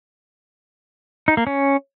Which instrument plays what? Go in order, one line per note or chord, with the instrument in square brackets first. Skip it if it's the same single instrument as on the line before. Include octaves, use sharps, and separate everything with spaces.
[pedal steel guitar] D#4
A#3
C#4